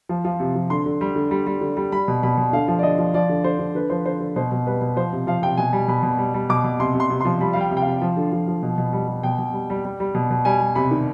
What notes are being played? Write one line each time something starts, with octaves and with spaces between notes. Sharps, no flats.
F3
F3
C3
F3
D3 C6
D3
G3
D3
G3
G3
D3
G3
G3 B5
B2
B2 B5
B2
D3 F5
F3
D5
D3 D#5
F3
F3 D5
D3
D3 C5
D3
D3 B4
F3 C5
D3 C5
D3
B2 C5
B2
G3 B4
B2
F3 C5
C3
F3 F5
C3 G5
B2 G#5
G3
B2 B5
B2
G3
G3
B2 D6
B2
C3 C6
C3
C6
C3
F3 C6
G3 B5
G3 F5
G5
C3
G5
C3 F5
F3
D3
F3
F3
B2
B2
G3
G3
B2 G5
B2
G3
G3
G3
G3
B2
B2
G3 G#5
G3
C3 B5
D#3